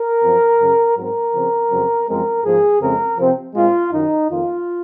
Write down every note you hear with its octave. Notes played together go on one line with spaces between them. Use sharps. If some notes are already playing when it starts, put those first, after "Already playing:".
Already playing: A#4
F#2 F3 C4
F#2 C#3 F#3
G#2 F#3 C4 A#4
C#3 F3 C4
F2 C#3 F#3 C4
F#2 F3 G#3 C4 A#4
G#2 F3 A#3 G#4
F2 C#3 G#3 C4 A#4
C3 F3 C4
A#2 G#3 C4 F4
F#2 D#3 F#3 D#4
F2 D#3 A#3 F4